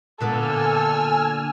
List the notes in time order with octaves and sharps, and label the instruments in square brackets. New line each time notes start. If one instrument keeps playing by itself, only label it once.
[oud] A#2 D3 B3 [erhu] A4 [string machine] G#5 E6 F6